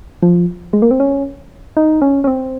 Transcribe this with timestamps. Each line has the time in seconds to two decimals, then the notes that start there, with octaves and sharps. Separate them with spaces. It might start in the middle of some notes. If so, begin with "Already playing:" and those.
0.23 F3
0.73 G#3
0.82 A#3
0.91 C4
1.00 C#4
1.77 D#4
2.02 C#4
2.24 C#4
2.27 C4